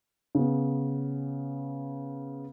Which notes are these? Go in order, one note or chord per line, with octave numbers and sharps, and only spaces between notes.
C#3 B3